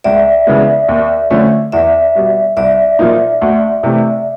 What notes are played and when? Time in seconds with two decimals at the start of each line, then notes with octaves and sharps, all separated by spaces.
0.04 C#2 D5 E5
0.47 C#3 E3 G#3 B3
0.88 D#2
1.30 D3 F3 A3 C#4
1.72 E2 D5 E5
2.15 B2 G3
2.57 C2 D5 E5
2.99 A#2 F3 A#3 D#4
3.41 D2
3.83 C3 E3 A3